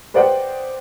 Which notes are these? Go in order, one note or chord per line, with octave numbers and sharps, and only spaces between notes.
B4 C5 D5 D#5 F#5 G5